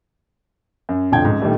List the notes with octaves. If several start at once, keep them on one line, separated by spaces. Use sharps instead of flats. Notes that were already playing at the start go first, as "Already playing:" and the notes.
F#2
F1 B1 D3 F3 G5 G#6
C#2 G#2
A#1 D#3 G3 A3